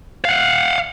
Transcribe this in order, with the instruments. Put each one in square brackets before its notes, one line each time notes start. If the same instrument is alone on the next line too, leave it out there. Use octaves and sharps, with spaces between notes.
[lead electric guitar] F5 F#5